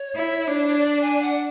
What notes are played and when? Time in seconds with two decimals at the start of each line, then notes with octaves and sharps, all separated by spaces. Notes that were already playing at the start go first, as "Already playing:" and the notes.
Already playing: C#5
0.15 E4
0.47 D4
0.68 C#5
0.79 D5
1.01 G#5
1.23 F#5